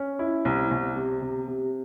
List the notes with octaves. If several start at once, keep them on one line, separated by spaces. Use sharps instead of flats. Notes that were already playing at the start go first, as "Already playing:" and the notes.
Already playing: C#4
E4
C2
C2
C3
C3
C3